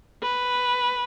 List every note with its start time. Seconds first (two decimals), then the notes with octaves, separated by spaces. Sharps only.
0.22 B4